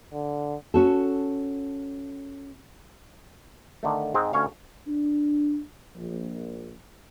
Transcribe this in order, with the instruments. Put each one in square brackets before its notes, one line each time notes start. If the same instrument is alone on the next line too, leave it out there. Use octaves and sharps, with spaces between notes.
[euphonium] D3
[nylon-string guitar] C#4 F#4 A4
[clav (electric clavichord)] D3 D#3 A3
G#2 G#3 C4
D2 C#4 C#5 F5
[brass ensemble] D4
A#1